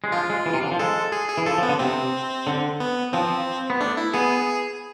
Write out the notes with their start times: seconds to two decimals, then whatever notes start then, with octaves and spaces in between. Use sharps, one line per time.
0.04 G#3
0.12 F3 F4
0.30 G#3
0.46 E3
0.54 C3
0.63 D3
0.72 F3
0.79 G#3 A4
1.12 G#4
1.29 G#4
1.38 E3
1.46 F3 A4
1.58 F3
1.63 B3
1.69 D3
1.79 C3 C4
2.47 D3
2.80 B3
3.13 F3 C4
3.70 B3
3.80 A3 D4
3.97 E4
4.14 B3 G#4